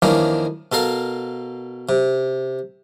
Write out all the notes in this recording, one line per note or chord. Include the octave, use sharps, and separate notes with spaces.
F2 D#3 E3 A#3 C#4 D4
B2 A4 A#4 F5
C3